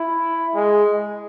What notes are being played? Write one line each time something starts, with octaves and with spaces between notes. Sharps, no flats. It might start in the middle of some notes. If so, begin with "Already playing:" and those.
Already playing: E4
G#3